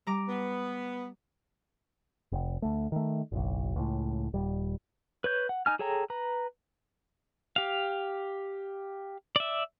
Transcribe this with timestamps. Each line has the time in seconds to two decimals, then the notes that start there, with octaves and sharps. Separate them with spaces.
0.07 G3 A#5 D6
0.28 B3
2.32 F1
2.62 D2 A3
2.92 D#3 A3
3.32 F#1 B1
3.76 C#2 A2
4.34 D#1 G3
5.24 B4 C#5 G6
5.49 F#5
5.66 D#4 G#5 F6
5.79 G#4 A4 C#5 G5 A#5
6.10 B4 A#5
7.56 G4 F5
9.36 D5 E5